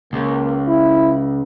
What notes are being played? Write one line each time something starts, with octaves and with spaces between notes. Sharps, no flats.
C#2 A#3
E4